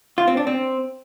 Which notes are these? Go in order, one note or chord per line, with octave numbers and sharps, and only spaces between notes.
F4
C4
D4
C4